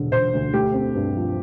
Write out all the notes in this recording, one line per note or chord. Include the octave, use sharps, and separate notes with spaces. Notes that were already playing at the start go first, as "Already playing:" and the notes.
Already playing: E1 D3
E1 C5
D2
A3 G4
C4
G2
F3